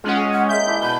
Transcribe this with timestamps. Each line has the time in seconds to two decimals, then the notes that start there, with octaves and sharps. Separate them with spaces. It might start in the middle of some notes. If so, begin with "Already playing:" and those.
0.04 G#3 C#4 F4 F#5
0.17 G#4
0.33 F#5
0.49 G#3 A#3 E5 G6
0.67 E4 D5 A5
0.82 B2 B5